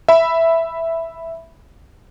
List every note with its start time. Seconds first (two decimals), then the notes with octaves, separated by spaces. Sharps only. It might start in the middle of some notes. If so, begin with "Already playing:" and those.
0.08 E5 B5